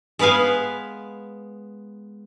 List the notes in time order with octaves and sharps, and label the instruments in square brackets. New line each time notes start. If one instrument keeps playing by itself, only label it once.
[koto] G#3 B3 B4 F5 G#5